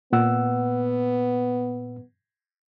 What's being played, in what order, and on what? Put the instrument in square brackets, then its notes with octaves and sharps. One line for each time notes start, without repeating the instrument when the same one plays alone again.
[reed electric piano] A#2 F#5 E6 [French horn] B3